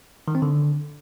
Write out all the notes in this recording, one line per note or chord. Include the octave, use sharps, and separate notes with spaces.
D#3
C4
D3